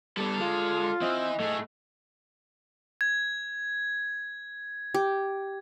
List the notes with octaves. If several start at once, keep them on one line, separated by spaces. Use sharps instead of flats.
G3 B3 A4 D5
G#3 F4
E3 C4 D#5
A2 A3 G#4
G#6
G4